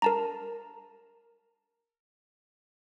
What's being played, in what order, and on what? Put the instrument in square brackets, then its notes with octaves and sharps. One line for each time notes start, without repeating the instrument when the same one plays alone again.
[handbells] A#4 A5 A#5